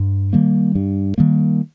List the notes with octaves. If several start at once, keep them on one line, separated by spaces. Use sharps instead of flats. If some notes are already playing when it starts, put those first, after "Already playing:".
Already playing: G2
D#3 G3 A#3
G2
D#3 G3 A#3